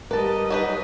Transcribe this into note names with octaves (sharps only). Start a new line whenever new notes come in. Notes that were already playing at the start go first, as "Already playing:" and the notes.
G3 A#4 B4 D#5 A5
F#3 D#4 B4